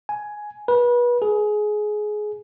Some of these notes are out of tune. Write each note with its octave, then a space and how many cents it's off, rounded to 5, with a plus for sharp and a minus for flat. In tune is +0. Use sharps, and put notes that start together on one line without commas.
G#5 +10
B4 -30
G#4 +20